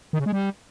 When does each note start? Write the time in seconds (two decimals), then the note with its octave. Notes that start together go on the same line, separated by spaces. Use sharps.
0.13 D#3
0.20 C#3
0.26 G#3
0.32 G3